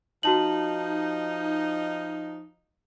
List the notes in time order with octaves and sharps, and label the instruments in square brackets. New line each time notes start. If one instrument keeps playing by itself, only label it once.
[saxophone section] F3 D#4 [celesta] F#4 A5 F#7